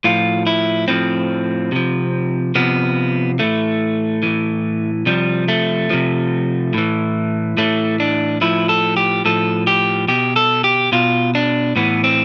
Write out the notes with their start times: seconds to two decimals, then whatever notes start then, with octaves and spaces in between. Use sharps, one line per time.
0.04 A2 F3 F4
0.47 E4
0.88 A2 F3 C4
1.72 C3 F3
2.55 C3 F3 B3
3.39 A2 E3 A3
4.23 A2 E3
5.06 C3 F3 G3
5.48 A3
5.90 C3 F3
6.74 A2 E3
7.57 A2 E3 A3
8.00 D4
8.41 A2 F3 E4
8.69 A4
8.97 G4
9.25 A2 F3 A4
9.67 G4
10.08 B2 G4
10.36 A4
10.64 G4
10.92 B2 F4
11.35 D4
11.76 A2 E3 B3
12.04 C4